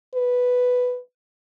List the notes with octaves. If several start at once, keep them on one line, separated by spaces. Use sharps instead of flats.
B4